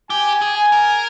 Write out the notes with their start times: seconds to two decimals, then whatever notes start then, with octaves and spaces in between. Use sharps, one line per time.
0.10 G4 G#5
0.42 G#4
0.56 G#5
0.72 A#4